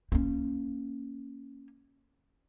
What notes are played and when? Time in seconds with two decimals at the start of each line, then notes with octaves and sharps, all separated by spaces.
0.12 A#3 C#4